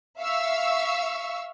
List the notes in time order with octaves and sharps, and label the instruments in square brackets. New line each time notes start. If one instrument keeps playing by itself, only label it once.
[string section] E5 F5 C#6 E6